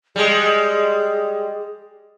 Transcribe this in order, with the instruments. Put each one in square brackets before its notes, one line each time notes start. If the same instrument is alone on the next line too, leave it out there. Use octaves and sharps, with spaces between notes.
[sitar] G3 G#3 [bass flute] G#4